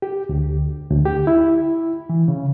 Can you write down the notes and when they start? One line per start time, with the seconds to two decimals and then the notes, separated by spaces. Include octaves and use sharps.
0.02 G4
0.29 D2
0.90 D2
1.05 G4
1.27 E4
2.09 E3
2.28 C#3